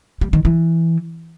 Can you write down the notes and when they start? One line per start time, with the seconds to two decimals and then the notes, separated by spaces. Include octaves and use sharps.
0.21 G3
0.33 D#3
0.45 E3